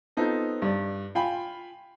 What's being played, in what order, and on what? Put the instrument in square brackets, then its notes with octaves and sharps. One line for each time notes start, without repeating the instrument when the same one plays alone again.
[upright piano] B3 C4 D#4 F4 A4
G2 D5
F4 F5 G5 G#5 B5